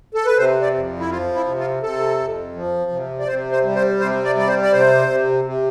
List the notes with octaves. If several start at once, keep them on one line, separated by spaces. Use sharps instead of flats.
A4
B4
C3 C5
D5
F2
E4
F3 F4
E4
C3
F4
C3 A4
F2
F3
C3
D5
C3 C5
C5
G3
C5
C3 C5
D5
G3 D5
C5
D5
C3 C5
C3
C3